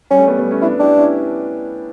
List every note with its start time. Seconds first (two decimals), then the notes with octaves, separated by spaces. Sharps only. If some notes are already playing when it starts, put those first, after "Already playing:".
0.10 G3 C#4
0.19 A3
0.28 G3 B3
0.39 G3 B3
0.51 A3 C#4
0.62 B3 D4 E4
0.79 D4 E4 G4
0.97 C#4 E4